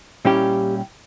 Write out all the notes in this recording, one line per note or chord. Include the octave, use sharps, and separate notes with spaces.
A#2 G3 C#4 E4 G4